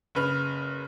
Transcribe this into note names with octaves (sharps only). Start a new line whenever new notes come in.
F#1 C#3 B4 F6